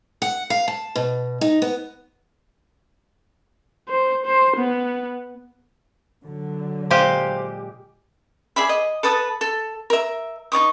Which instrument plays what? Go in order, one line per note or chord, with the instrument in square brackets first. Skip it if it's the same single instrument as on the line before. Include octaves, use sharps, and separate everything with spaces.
[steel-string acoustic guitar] F#5
F5
A5
B2
D#4
B3
[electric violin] C5
C5
B3
[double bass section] D3 F#3
[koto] A#2 G#3 G4 [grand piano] C5 F5 C6
[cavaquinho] G#4 D5 E5 B5
D#5
A4 B4 A5 D#6
A4
A#4 E5
D#4 D5 C#6 D#6